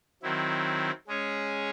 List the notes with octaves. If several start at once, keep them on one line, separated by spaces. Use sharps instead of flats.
D#3 F#3 C4 E4
G#3 C#4 G#4 C#5